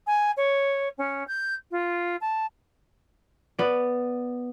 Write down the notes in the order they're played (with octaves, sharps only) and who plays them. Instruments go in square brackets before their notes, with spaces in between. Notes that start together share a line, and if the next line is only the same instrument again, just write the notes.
[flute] G#5
C#5
C#4
G6
F4
A5
[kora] B3 D5